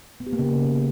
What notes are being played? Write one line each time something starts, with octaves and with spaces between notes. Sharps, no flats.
B3
G4
A#3
C#3